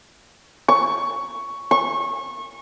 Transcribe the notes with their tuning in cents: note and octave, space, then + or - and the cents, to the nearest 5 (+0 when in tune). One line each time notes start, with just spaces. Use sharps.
C#6 +10
C#6 -25